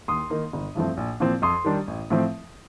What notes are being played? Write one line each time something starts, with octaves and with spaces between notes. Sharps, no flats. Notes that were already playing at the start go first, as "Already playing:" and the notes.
D#2 C6 D#6
D#3 A#3 D#4
G1
G2 F3 A3 C4
A#1
A#2 F3 C4
F2 C6 D#6
D#3 G3 D4
A1
A2 F3 C4